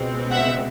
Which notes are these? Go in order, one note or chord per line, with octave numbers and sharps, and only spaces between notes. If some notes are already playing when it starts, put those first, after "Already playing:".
Already playing: C#2 B2 G#3 C4
E5 F#5